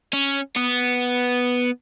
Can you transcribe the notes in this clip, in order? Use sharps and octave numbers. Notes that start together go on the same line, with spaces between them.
C#4
B3